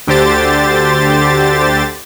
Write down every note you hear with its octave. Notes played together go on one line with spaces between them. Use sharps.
D2 D3 G4 C5 A6